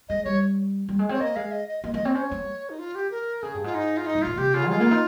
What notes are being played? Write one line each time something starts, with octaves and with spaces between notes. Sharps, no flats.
G#3 D#5
G3 C#5
G3
G#3
C4 C#5
A#3 D#5
G#3 F5
D#5
D#5
A#3 D#5
A#3 D#5
C4 C#5
C#4 C5
C#5
C4
D#3
D#4
F4
G4
A#4
C#3 G#4
G2
G#2 F4
D#4
F4
D#4
G#2
A#2 F4
C3 G4
C#3 F4
G#3 F4
A#3
D#4